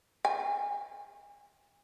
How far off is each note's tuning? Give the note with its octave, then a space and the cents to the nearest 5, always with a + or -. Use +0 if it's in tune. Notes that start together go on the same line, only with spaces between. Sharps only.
G#5 -30